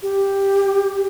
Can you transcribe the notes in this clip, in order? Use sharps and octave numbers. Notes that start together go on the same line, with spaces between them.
G4